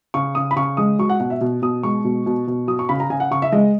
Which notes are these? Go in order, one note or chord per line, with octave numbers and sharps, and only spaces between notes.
C#3 C#6
C#3 D#6
B5
C#3 C#6
G#3 D#6
F#3 C#6
F#5
B2 F#5
E5
B2
B2 D#6
G#3 C#6
B2
B2
B2
F#3 D#6
C#6
C#3 B5
A#5
C#3 G#5
F#5
C#3 C#6
E5
G#3 D#5